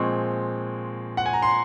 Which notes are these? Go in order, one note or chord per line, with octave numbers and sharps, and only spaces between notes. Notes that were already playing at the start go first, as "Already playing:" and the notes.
Already playing: A#2 F3 G#3 C4 C#6
F#5
G#5
A#5
C6